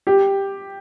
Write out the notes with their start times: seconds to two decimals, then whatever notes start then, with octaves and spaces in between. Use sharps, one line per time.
0.07 G4